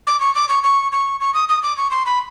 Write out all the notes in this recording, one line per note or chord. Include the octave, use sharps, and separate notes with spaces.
D6
C#6
D6
C#6
C#6
C#6
C#6
D#6
D#6
D6
C#6
C6
B5